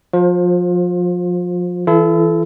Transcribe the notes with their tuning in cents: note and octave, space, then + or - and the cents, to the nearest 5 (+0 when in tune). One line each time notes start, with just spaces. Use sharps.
F3 +30 F4 +30 C5 +10
E3 +0 E4 +40 A4 -25